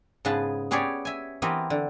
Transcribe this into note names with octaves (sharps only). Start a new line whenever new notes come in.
G#2 C#3 B3 G#4 B4 A5
B3 C#4 G4 G#4 C#5 D5
E5 G#5
E3 B3 C4 G4 A#4 D#5
D3